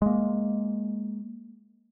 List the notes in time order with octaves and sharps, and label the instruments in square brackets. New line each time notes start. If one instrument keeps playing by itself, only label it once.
[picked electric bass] G#3 A#3